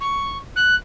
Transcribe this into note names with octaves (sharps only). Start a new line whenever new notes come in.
C#6
F#6